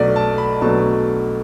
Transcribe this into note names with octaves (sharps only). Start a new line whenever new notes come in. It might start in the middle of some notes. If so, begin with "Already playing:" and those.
Already playing: B1 B2 F#3 A3 D4 D5
A5
B5
B1 B2 F#3 A3 D4 A5